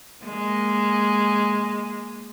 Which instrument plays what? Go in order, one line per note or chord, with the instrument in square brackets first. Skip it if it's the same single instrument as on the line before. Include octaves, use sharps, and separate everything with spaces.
[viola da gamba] G#3 A#3